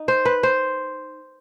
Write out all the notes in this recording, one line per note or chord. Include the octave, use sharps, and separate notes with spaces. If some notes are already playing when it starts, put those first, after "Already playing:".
Already playing: D#4
C5
B4
C5